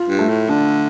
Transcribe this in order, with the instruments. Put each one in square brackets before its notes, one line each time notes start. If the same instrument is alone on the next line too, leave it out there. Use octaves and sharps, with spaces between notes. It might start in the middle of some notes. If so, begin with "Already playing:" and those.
Already playing: [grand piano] F4
[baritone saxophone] G2
[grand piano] A3
[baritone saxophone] A2
[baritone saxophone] D3 [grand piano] D4